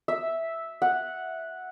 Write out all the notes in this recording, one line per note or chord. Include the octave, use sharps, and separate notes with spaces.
E5
F#5